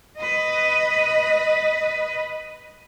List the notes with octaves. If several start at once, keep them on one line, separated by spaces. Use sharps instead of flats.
B4 D#5